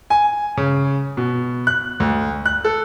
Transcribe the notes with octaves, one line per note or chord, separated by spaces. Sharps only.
G#5
C#3
B2
F#6
D2
F#6
A4